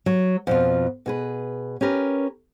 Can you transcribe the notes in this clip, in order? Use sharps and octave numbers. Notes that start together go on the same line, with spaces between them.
F#3
F2 B2 F4
B2 G#4 B4
C#4 G4 A#4 B4